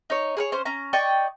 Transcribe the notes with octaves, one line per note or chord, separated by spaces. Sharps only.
D#4 C#5
G#4 A#4 C#5
C#4 C5
C#4 A#5
D5 D#5 G5 C#6